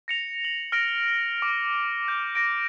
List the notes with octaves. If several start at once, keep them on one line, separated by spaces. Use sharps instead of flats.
A#6 C#7 F7
F#7
F6 A#6 D7
D6
G6
A#6 D7